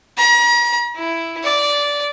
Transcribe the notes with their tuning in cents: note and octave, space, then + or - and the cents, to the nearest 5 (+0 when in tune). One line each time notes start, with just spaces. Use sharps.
A#5 +40
E4 +5
D5 -15